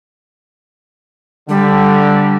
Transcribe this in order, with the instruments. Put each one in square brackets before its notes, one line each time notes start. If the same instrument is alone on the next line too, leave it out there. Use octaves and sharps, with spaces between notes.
[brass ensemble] D3 [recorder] G3